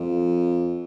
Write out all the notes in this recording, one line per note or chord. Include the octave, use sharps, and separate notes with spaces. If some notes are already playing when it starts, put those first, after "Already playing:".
Already playing: F2